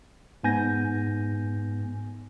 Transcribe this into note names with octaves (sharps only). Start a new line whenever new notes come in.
G#2 B3 G#5 G6 A#6